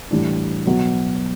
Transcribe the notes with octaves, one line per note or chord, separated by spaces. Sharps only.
A2 E3 G3 D4
B2 F#3 B3 F#4